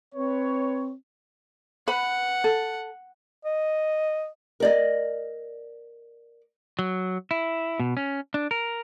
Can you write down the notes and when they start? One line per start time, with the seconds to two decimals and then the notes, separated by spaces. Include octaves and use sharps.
0.15 C4 B4 C#5
1.88 B4 F#5 B5
2.44 A4
3.45 D#5
4.60 A#4 D5 D#5
6.79 F#3
7.31 E4
7.80 B2
7.97 C#4
8.34 D4
8.51 A#4